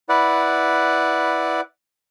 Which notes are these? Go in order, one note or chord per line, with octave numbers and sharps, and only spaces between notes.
E4 B4 D5 F#5